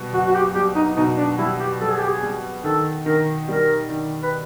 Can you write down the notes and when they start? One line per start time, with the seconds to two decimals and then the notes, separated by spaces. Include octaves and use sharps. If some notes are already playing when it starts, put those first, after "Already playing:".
Already playing: B2 G3
0.13 F#1 F#4
0.27 F#4
0.34 G4
0.55 G3 G4
0.76 D#4
0.97 B2 D#4
1.18 D4
1.38 G3 E4
1.60 G4
1.81 G3 A4
1.91 G#4
2.01 G4
2.09 G#4
2.23 G3
2.64 D#3 A4
3.05 D#3 A#4
3.48 G3 A#4
3.89 D#3
4.23 B4